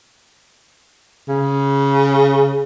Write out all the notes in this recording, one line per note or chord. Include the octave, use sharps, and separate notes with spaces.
C#3